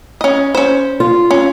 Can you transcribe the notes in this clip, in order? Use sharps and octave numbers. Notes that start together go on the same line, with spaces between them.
C#4 D#5
C#4 C5
F4
C#4